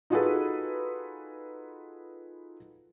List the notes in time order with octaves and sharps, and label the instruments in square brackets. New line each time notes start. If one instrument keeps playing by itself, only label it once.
[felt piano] D#4 F4 F#4 G#4 A4 B4